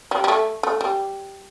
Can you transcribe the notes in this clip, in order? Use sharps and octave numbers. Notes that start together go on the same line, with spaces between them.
G3
G3
A3
A3
G3